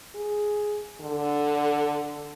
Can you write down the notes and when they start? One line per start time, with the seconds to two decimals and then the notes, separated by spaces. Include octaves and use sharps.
0.15 G#4
1.01 D3